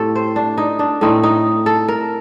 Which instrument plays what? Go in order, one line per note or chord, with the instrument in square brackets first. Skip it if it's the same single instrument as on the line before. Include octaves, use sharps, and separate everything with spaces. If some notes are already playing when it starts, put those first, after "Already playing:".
Already playing: [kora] A2 A3 C4 G4 A4
C5
D4
D#4
D4
A2 A3 C4 D#4
D#4
A4
A#4